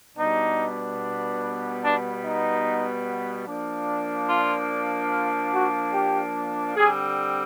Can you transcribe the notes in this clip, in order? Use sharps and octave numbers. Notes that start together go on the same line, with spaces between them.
B2 G3 B3 D4 D#4
D4
D#4
F3 A#3 D4
F4
F4
F#4
G4
D3 G3 C4 G#4